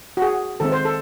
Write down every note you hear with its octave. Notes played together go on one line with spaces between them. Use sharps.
F#4
G#4
D#3 G#3 C4 A4
C5
A4